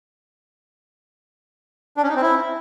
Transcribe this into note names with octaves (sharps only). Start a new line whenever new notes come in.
D4
C#4
D#4
C4
E4